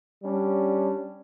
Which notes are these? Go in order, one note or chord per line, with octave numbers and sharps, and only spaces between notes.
G3 C#4 D4